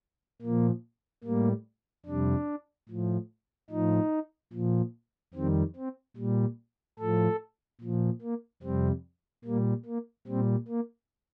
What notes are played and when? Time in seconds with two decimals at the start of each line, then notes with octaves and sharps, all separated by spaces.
0.42 A#2 F3 A#3
1.24 A2 G3 A#3
2.06 F2 C3 G3 D4
2.89 A2 F3
3.70 A2 F3 D#4
4.53 A#2 F3
5.34 F2 D#3 G3 C4
5.76 C4
6.17 A#2 G3
6.99 A2 F3 A4
7.81 A#2 F3
8.22 A#3
8.63 F2 C3 G3 C4
9.44 A#2 G3 A#3
9.86 A#3
10.27 A#2 G3 C4
10.68 A#3